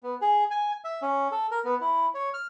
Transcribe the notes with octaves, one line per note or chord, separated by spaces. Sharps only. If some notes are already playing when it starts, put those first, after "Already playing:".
B3
G#4
G#5
E5
C#4
A4
A#4
B3
E4
C#5
F6